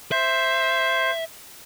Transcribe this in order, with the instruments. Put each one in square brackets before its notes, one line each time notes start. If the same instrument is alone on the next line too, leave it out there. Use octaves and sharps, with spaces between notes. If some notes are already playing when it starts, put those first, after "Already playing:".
[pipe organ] C5 [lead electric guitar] E5